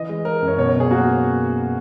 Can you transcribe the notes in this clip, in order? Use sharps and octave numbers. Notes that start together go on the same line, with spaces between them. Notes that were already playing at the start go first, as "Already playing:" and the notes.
Already playing: E3 D#5
G#3
G#3 A#4
F#2
C#5
B2 C#5
C#5
B2
G#4
A#3 F#4